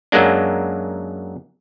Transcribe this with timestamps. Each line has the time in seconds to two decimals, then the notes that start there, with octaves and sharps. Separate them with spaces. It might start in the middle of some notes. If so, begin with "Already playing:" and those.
0.12 F#2 F#3 G#3 A#3 D4